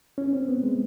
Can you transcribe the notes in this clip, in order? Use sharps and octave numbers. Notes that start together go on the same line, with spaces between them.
C#4
C4
B3
G#3